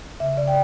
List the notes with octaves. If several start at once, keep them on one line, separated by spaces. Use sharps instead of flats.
C#3 E5
C#3 D5
G5